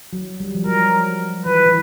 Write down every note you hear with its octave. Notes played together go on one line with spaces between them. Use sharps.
F#3
G3
F3
F#3 A#4
E3 B4
E3